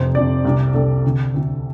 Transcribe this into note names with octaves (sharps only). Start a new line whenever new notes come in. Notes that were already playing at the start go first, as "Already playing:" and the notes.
Already playing: F1 F2 C3 C5
F1 F2 C3 D5
C2 C3
C2 C3 A4
D2 C3
D2 C3